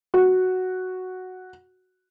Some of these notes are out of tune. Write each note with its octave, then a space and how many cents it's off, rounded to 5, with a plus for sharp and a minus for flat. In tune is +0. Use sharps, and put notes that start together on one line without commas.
F#4 +0